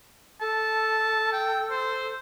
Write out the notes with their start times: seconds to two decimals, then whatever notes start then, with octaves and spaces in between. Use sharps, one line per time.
0.41 A4 A5
1.33 G5
1.70 C5